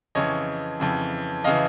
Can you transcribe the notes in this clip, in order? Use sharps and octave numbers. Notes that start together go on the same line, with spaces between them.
F2 C#3 E3 C#5 D#5
F2 C#3 E3
C#3 E3 D#5 F5